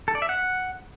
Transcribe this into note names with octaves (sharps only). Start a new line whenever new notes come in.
A4
D5
E5
F#5